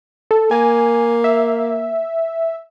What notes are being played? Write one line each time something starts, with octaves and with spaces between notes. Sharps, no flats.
A4
A#3 G#5
E5